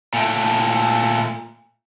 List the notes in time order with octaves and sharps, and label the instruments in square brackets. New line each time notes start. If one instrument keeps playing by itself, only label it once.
[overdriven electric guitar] A#2 A3